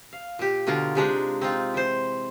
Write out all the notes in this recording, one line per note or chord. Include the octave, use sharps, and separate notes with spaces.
F5
A#2 G4
B2 D3 F4 A#4
C3 G#3 D4 D#4
C4 D#4 F4
E3 C5